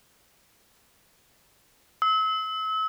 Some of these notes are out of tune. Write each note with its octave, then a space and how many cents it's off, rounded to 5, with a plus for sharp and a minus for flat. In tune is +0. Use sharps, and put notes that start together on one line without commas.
E6 -35